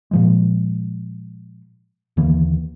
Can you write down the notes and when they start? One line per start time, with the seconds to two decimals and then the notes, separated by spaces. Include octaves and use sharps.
0.11 A#2 F3 G#3
2.17 D#2 D3 E3 A#3